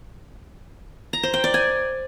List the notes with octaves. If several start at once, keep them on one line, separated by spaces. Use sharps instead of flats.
A#5
C5
G5
D5
G#5